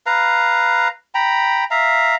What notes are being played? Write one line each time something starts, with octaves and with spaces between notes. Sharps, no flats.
B4 F5 A#5
G5 A#5 B5
E5 F5 A#5